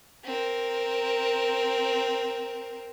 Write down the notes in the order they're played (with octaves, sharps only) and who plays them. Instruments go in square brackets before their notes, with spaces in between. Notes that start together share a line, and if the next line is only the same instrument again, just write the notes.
[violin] C4 A#4